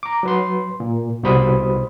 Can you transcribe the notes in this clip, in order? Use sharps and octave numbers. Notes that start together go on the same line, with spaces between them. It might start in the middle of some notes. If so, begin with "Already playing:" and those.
A#5 D6
F#3 B4 C6
A#2
C2 B2 G3 C5 B5 D#6